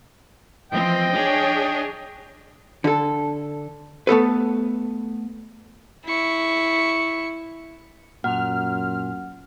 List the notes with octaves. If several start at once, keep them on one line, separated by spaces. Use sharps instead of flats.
E3 F3 C4 D#5 G5
D4 G#4 C#5
D3 A4
A3 B3 A4 B4
E4 C#6
F#2 A#2 F#5 F6